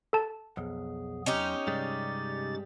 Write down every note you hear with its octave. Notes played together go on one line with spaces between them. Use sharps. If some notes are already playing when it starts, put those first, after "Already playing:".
A4 A5
B1 F2 B3 G#4
E2 F#3 C#4 D#4 G4 C6
G2 C3 G3 G#3 D6 A6